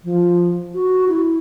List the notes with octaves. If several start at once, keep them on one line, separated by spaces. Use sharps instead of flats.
F3
F#4
E4